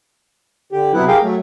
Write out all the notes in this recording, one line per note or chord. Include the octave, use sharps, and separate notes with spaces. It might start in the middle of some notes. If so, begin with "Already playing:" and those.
D3 G4
C3 F#3 B3 E4 F#5
G4 G#4 A#4 F5 G5
F#3 A3